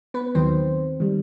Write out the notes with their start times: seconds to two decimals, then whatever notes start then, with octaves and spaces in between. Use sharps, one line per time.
0.14 B3 B4
0.35 D#2 D#3 F#3 C4 C5
1.00 D#3 G3